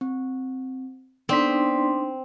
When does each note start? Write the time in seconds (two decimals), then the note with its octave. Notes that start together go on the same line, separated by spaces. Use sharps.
0.01 C4
1.29 B3 C4 D4 D#4 D5 C6 B6